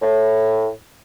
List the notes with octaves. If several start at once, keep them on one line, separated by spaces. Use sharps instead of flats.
A2